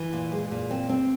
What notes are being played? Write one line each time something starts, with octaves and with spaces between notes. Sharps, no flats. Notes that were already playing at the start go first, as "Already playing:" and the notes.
Already playing: E3
A#2
G#3
A#2
C4
C4